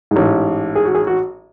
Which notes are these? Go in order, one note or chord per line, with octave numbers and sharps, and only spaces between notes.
A1 G#2
G#4
F#4
G#4
F#4